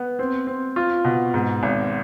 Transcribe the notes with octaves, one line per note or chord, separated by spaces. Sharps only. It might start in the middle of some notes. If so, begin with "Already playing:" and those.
Already playing: B3
C4
C4
F4
B2
G#2
G#1